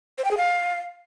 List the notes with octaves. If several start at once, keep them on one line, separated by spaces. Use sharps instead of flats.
C5
G5
G#4
F5